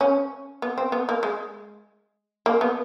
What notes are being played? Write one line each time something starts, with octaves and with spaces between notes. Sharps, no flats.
C#4
B3
C4
B3
A#3
G#3
A#3
B3